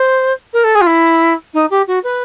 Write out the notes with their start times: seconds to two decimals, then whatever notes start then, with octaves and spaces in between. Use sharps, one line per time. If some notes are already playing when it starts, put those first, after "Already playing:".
Already playing: C5
0.53 A#4
0.64 A4
0.75 G#4
0.81 F4
0.86 E4
1.53 D#4
1.70 G4
1.87 F#4
2.03 B4